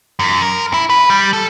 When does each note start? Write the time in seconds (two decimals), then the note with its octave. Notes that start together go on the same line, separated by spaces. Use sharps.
0.19 F#2
0.42 A#4
0.74 E4
0.90 B4
1.10 G3
1.33 A4